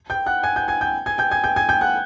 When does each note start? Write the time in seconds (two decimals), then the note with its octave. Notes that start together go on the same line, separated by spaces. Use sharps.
0.10 G5 G6
0.26 F#5 F#6
0.43 G#5 G#6
0.56 G5 G6
0.68 G#5 G#6
0.81 G5 G6
1.06 G#5 G#6
1.18 G5 G6
1.31 G#5 G#6
1.44 G5 G6
1.56 G#5 G#6
1.69 G5 G6
1.81 F#5 F#6